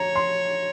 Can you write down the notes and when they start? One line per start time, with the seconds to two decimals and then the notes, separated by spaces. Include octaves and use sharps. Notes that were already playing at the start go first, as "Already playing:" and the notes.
Already playing: C#5 A#5
0.16 C6